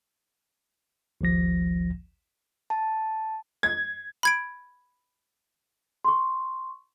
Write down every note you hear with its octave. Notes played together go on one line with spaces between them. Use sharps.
G#1 D2 F3 A#6
A5
G#6
B5 G#6 D7
C6 C#6